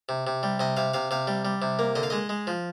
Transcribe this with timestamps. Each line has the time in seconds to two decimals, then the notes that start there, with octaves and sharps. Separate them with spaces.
0.09 C3
0.27 C3
0.43 G3
0.60 C3 D#5
0.77 C3 F5
0.93 C3 F5
1.11 C3 F5
1.27 G3
1.45 G3
1.62 C3
1.79 A#3
1.95 D3 D#5
2.03 F5
2.10 G#3 D#5
2.29 G#3
2.47 F3